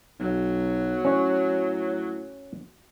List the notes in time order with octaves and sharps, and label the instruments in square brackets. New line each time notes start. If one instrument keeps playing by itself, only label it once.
[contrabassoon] B1 [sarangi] F#3
[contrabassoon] A2 [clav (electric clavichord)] C#4 C#5